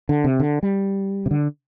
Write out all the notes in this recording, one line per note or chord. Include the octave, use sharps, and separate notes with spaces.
D3
C3
D3
G3
C3
D3